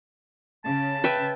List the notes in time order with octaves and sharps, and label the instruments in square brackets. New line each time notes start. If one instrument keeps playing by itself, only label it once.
[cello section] C#3 [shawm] A5
[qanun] B4 E5 G5